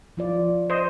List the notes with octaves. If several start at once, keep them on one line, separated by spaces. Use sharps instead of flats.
F3 F4 D5
C5 D#5